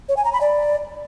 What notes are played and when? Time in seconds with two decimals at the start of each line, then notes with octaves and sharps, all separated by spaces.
0.09 C#5
0.17 G#5
0.25 A#5
0.33 B5
0.41 D5